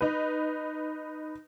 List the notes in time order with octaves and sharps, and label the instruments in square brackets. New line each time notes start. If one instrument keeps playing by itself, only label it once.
[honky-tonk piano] D#4 B4